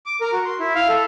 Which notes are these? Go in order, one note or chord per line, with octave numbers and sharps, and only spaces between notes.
D6
A#4
F#4
C6
E4
F5
A4